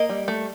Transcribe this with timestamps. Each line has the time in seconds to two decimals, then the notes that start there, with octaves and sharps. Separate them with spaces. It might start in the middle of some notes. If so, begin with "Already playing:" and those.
Already playing: A#3 D#5
0.09 G3
0.28 A3